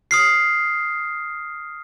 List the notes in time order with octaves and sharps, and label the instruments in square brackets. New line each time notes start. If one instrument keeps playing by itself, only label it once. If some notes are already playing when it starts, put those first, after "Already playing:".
[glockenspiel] D#6 F6 C7